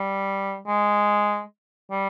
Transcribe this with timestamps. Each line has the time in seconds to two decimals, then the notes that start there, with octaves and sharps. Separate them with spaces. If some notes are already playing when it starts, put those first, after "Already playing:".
Already playing: G3
0.67 G#3
1.91 G3